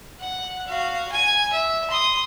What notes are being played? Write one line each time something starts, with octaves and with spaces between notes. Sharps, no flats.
F#5
F#4 F5
G#5
E5
C6 D#6